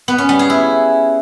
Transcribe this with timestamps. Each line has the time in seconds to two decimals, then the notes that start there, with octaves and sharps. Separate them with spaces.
0.08 B3
0.18 C#4
0.29 G3
0.39 G#4
0.50 E4